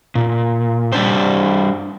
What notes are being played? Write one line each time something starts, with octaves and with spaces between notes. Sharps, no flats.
A#2
G3 D4 C5